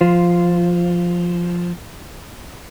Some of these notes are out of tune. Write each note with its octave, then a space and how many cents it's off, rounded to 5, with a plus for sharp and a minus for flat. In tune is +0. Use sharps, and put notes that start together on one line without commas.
F3 +0 F4 +0 C5 -5